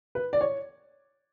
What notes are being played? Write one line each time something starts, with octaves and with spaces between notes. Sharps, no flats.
B4
D5
C#5